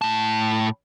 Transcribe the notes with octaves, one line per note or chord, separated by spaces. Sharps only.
A2 A5